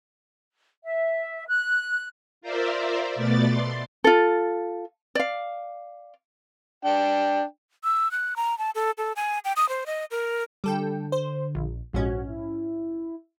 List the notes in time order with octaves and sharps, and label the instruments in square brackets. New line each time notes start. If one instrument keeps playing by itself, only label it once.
[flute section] E5
F#6
[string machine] F4 A#4 C5 D5 E5
B2 A3 B3 D5 A6
C6
[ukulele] F4 A4
D5 F5
[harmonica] D4 G5
[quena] E6
F#6
A#5
A5
A4
A4
G#5
G5
D#6
C5
D#5
A#4
[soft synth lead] D3 [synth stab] G3 A4 G5
[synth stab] C5
A#1
[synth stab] A#1 G#2 C#4 [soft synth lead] F#4
[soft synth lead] E4